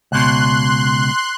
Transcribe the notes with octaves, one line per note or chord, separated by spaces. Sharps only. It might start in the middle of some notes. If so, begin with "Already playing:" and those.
C#2 B2 C6 F#6